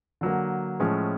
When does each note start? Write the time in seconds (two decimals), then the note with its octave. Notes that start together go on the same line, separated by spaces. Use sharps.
0.21 D3 F#3 A#3
0.80 A2 F3 G#3 C#4